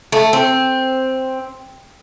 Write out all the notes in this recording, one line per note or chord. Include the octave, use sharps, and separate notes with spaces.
A3
C4